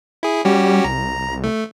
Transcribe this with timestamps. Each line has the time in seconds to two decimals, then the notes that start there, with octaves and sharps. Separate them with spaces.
0.23 E4 G#4
0.45 G3 C#4 F#4 G4
0.84 C2 A#5
1.44 A3